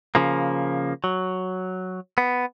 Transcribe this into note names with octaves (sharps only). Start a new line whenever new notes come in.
C#3 F3 A#3
F#3
B3